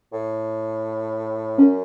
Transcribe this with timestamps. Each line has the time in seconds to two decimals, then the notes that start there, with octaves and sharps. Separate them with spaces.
0.13 A2
1.58 F#2 C#4